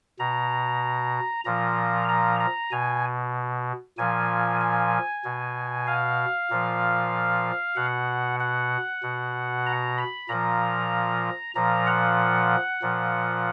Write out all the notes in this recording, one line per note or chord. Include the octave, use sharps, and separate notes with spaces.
B2 A#5
A#2 F3 A#5
A#5
A#5
B2 G#5
A#2 F3 G#5
G#5
B2
F5
A#2 F3
B2 F#5
F#5
B2
A#5
B5
A#2 F3 A#5
A#2 F3 A#5
F#5
A#2 F3